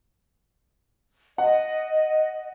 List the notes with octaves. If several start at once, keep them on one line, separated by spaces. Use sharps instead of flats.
D#5 F#5